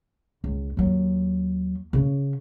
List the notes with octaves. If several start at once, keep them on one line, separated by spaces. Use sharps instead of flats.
C#2
D#2 F#3
C#3 C#4